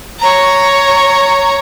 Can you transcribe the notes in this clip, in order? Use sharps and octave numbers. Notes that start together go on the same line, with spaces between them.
C#5 A#5